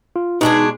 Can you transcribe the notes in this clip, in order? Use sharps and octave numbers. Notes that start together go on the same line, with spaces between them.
F4
B2 G#3 D4 D#4 G#4